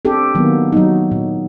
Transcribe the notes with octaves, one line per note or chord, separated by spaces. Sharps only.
C4 D4 G4 A4
D#3 F#3 A#3 B3
F#3 D#4
A#2